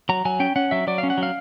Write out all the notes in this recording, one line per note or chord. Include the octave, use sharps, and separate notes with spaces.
F#3 A#5
F#3 G#5
C#4 G5
C#4 F#5
F#3 E5
F#3 D5
F5
C#4
F#5
F#3
F5